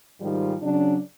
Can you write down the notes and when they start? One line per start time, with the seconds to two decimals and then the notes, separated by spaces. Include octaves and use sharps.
0.21 G#2 D#3 F3 G3
0.62 C#3 F#3 D4